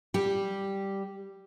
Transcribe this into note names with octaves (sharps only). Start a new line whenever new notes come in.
G3 G4